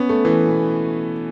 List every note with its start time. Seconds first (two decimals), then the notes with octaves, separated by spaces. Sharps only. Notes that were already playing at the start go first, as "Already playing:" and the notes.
Already playing: B3 C#4
0.09 A3
0.25 E3
0.47 B2